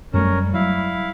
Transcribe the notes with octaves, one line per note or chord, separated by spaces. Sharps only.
F#2 F#3 G3 A3 C#4 A#4
F#3 E4 F5